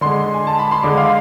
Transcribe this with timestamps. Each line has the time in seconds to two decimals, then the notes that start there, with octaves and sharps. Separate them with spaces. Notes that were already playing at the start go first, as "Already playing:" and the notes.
0.01 D3 G#3 C6
0.34 G#5
0.47 A5
0.59 B5
0.71 C6
0.83 D3 G#3 D6
0.97 F5